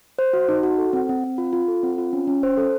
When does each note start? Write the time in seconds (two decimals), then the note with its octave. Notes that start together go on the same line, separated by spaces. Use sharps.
0.19 C5
0.33 F#4
0.49 D#4
0.63 F#4
0.78 A4
0.93 C4
1.09 C4
1.24 C4
1.38 F4
1.53 F4
1.68 A4
1.83 C4
1.98 F4
2.13 C#4
2.27 C#4
2.43 C5
2.57 A4